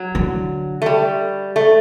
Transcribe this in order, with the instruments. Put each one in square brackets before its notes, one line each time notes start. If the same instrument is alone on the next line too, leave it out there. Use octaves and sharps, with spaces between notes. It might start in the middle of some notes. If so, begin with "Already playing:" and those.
Already playing: [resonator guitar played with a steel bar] F#3
[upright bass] D3
[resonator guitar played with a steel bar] A3
G3
A3